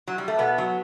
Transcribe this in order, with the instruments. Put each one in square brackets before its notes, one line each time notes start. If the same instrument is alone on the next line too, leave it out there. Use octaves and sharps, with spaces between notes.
[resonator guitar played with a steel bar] F#3
G3
A3
B2 B3
F#3